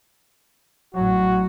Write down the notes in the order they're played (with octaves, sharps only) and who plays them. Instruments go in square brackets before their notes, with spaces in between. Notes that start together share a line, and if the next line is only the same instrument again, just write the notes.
[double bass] A1 F#3 [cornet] F#4